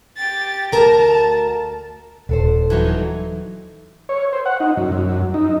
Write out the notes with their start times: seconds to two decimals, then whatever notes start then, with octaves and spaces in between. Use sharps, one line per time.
0.17 G4 A6
0.72 D2 A#4 A5 A#5
2.29 D#1 D3 A4 C5
2.70 E3 F#3 D#4
4.09 C#5
4.33 C5
4.46 F#5
4.60 D#4
4.77 F#2
4.92 F#2
5.34 D#4